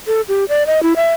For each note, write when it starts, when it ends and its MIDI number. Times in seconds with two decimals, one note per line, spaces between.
0.07 0.21 69
0.28 0.45 67
0.49 0.66 74
0.67 0.83 75
0.83 0.94 64
0.96 1.13 76